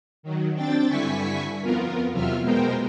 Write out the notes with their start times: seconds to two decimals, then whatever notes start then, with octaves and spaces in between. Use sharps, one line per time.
0.23 D#3 F#3
0.54 C4 D4 G5 A6
0.89 G2 D3 E4 G#5 C#6 B6
1.61 F2 B3 F4 A#4
2.12 E2 C3 F#3 F4 E5 F6
2.41 B2 G#3 B3 A#4 C5 G5